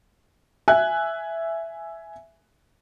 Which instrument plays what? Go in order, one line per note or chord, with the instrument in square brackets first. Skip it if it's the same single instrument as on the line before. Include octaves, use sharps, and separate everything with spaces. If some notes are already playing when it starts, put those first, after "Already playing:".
[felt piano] E5 G#5 F#6